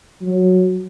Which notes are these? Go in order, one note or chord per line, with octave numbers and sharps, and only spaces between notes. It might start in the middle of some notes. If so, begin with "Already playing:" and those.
F#3